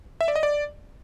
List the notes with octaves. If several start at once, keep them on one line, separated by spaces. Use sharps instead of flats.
E5
D5
D#5
D5